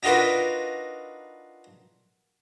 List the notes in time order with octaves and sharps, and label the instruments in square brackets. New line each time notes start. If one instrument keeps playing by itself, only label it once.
[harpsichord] D4 D#4 F4 F#4 A#4 B4